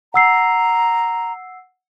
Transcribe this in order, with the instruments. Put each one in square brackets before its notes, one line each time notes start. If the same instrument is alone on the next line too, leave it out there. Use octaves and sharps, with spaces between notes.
[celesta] F#5 E6 C7 [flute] A#5